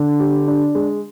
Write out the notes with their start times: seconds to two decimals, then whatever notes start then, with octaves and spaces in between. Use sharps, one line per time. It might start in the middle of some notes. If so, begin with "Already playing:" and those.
Already playing: D3 D4
0.20 G4
0.47 D4
0.75 G#3